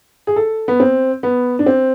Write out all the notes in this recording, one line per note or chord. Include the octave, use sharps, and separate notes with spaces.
G#4
A4
B3
C4
B3
D4
C4